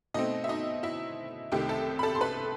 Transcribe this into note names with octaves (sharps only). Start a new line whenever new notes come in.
B2 A3 C4 D#4 D#5
E5
D#4 D#5
E4 E5
C2 C3 D#3 A3 G4 G5
A4 A5
B5
A4 A5
C6
B4 B5